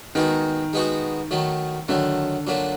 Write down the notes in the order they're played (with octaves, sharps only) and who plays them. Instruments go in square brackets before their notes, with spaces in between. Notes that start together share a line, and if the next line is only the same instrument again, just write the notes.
[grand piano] D#3 [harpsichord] G#3 B3 D#4 F#4
[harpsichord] G#3 B3 D#4 F#4
D#3 F#3 A3
[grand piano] D3 [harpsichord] D#3 F#3 A3
[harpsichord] A#2 F#3 A3 D4